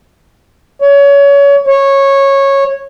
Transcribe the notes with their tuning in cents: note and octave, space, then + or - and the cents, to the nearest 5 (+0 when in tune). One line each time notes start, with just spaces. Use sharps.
C#5 +25
C#5 -15